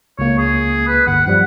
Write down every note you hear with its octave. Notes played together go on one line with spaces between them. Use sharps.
C#2 A#3 C#5
G#4
B4
G1 F#5
G2 F3 G3 F#5